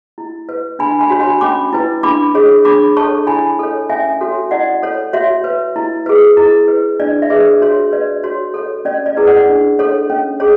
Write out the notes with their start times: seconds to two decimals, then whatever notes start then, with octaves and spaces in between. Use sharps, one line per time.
0.18 E4
0.49 B4
0.79 D4 G#5 B5
1.01 G#5 B5
1.10 F#4 C#5
1.21 G#5 B5
1.41 C#4 B5 D6
1.73 E4 B4
2.03 D4 B5 D6
2.35 G#4 C#5
2.65 D4 B5 D6
2.97 A4 C#5 A5 C#6
3.27 E4 G#5 B5
3.59 A4 C#5
3.89 C#4 E5 G#5
4.21 F#4 A4 C#5
4.51 E4 D5 F#5
4.82 A4 C#5
5.13 F#4 C#5 E5
5.44 B4
5.76 E4
6.06 G#4 B4
6.37 E4
6.68 B4
7.00 D4 D5
7.22 E5
7.30 G#4 B4 D5
7.61 F#4 C#5
7.92 B4 D5
8.23 F#4 C#5
8.54 A4 C#5
8.85 C#4 D5
9.06 D5
9.17 E4 G#4 B4
9.27 D5 F#5
9.48 D4
9.79 A4 C#5
10.10 C#4
10.40 G#4 C#5